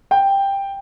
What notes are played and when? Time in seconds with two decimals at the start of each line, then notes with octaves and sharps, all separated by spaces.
0.11 G5